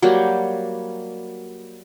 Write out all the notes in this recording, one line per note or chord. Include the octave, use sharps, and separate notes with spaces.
F#3 G3 A#3 G4